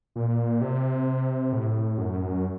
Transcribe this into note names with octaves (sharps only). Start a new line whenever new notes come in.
A#2
C3
A2
F#2